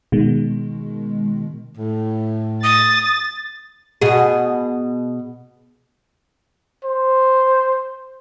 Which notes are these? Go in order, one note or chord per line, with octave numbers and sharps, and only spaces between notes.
B2 D#3 G#3
A2
D#6 A6
B2 G#4
C5